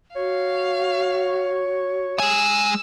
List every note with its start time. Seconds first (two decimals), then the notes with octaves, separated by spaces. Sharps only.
0.16 F#4 C#5 F5
2.19 G#3 G#5 E6